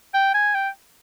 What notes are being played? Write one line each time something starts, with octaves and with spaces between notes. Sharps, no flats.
G5
G#5
G5